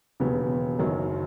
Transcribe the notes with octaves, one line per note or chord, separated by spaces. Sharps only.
E1 D#2 C#3 F#3 B3
F#1 F#2 D#3 F#3